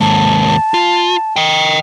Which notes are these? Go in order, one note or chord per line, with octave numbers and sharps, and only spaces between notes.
D#2 G#2 A5
F4
D#5 G5